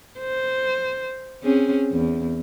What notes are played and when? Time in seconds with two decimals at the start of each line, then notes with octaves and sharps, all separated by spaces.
0.20 C5
1.44 C4 C#4 G#4
1.92 E2